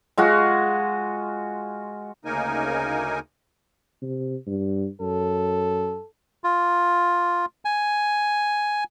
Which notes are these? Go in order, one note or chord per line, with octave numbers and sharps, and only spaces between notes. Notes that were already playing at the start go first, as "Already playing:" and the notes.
G#3 F4 F#4
D2 C#3 A#3 D#4 A#4 G#5
C3
G2
F#2 A4
F4
G#5